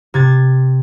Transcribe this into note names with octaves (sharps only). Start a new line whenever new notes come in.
C3 G#6 A6